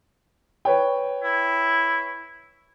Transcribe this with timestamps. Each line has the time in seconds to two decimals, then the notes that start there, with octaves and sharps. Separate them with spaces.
0.65 B4 C#5 G5
1.23 E4